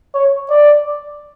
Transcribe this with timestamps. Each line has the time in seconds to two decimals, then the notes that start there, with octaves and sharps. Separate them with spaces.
0.14 C#5
0.50 D5